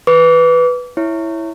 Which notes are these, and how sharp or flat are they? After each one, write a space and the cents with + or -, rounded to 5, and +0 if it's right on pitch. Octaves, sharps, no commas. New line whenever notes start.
B4 +0 D6 -35
E4 +0 C#5 +0